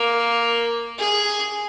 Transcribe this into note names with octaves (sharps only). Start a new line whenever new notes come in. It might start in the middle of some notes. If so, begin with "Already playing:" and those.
Already playing: A#3
G#4